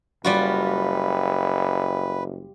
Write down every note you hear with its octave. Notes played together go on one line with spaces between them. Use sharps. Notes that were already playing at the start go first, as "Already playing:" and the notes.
F#1 G3 F4 F#4 B4